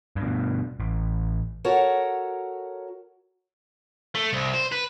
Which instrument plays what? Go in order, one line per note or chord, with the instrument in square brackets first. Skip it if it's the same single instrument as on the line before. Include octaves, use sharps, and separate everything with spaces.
[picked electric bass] G2 B2
A1
[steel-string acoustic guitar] F#4 A4 A#4 C#5 F#5
[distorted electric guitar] A3
C2
C5
B4